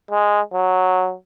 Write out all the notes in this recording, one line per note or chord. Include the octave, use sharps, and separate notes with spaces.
G#3
F#3